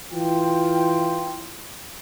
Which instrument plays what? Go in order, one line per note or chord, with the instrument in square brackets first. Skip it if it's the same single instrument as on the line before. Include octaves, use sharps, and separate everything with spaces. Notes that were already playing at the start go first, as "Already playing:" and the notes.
[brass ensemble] E3 F4 G5